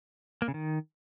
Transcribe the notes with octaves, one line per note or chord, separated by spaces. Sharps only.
A#3
C#3
D#3